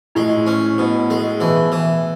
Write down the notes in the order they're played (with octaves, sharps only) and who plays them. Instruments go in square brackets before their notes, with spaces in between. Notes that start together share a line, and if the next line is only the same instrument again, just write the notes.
[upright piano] A2 [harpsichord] G#3
[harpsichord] C#4
B2
G#3
[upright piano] B2 [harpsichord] E3
[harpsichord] E3